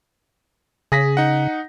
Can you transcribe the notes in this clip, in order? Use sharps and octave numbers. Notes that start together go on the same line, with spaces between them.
C#3 G#4 A#6 B6
D#4 F#5